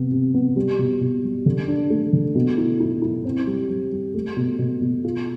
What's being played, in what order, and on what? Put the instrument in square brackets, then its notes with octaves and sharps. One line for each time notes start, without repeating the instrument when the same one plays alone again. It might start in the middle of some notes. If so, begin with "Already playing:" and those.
Already playing: [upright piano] C3 B3
C3
B3
G3
B2
B2
G3
D3
D4
A3
D3
B2
E4
E4
E4
C4
G3
G3
G3
A3
B2
B2
B2
F4